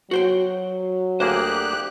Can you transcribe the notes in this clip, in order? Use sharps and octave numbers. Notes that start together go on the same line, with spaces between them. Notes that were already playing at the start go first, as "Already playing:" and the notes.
F#3 F#4 C5 G5
D2 A#3 G4 G#4 C5 F#6